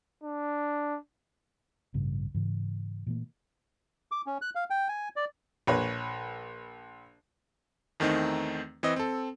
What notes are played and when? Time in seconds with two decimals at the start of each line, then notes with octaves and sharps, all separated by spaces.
0.24 D4
1.94 A1 G2 C#3
2.34 G#2 C#3 E3
3.06 A#2 E3 A3 A#3
4.11 D6
4.27 C#4
4.42 F#6
4.55 F5
4.70 G5
4.88 G#5
5.16 D5
5.67 A#1 B4 C#5
8.00 E2 D#3 A3 C4 D#4
8.83 E3 C4 D#5
8.96 C4 A4